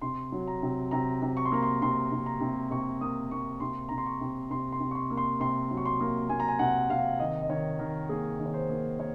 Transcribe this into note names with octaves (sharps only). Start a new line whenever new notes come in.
C3 C6
F#3
A#5
C3
C3 A#5
C3
C#6
C6
A#3 A#5
C6
C3 C6
C3
A#5
C3
C3 C#6
A#3 D#6
A#3 C#6
C3 C6
C3 A#5
C6
C#6
C3
C3 C6
C6
C3
C#6
C6
A#3
C6
C3 C6
F#3
C#6
C6
A#3
A#3 G#5
A#5
G#5
C3 F#5
C3 F5
D#3 D#5
D#5
D#3 C#5
D#3 A#4
A#3 G#4
D#3
C#5
C5
A#3
A#3 C#5